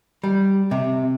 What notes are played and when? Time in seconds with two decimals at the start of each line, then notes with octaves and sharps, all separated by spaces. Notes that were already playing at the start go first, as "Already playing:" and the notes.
0.24 G3
0.71 C3